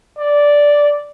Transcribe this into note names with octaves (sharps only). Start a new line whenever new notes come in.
D5